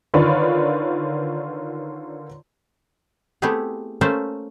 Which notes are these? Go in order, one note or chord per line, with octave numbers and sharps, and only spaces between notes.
D3 D#3 F4 B4 C#5 D5
A3 B3 C4 E4 G4 G#4
A3 A#3 C#4 C5 E5 A5